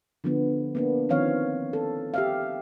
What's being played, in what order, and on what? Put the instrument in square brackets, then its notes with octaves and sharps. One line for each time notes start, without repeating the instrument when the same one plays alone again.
[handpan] D3 F3 B3
A#3 B3 D4
D#3 F3 C4 C#5 F5
A4
G4 E5 F5